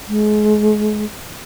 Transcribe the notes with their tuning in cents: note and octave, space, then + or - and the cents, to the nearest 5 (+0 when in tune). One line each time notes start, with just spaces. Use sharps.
G#3 +30